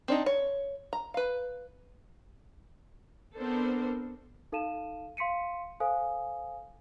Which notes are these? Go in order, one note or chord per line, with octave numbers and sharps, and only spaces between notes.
C4 D4 D#4
C#5
A#5
B4 F5
B3 C4 D4 A4 A#4 C5
D#4 A4 F5 A5 D#7 E7
F5 C6 B6 C#7 D#7
A4 C5 F5 G#5 D#6